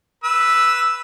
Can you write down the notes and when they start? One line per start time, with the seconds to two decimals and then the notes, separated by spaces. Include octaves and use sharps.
0.24 B4 E6